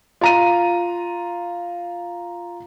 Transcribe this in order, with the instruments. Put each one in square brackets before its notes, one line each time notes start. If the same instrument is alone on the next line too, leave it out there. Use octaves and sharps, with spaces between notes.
[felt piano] F4 A#5 D#7